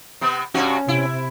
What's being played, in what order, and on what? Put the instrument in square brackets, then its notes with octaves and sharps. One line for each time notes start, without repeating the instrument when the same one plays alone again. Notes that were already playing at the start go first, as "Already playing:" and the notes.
[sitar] C3 B3
[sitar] G2 C3 F#4 [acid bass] C#4
[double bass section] C3 [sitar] E4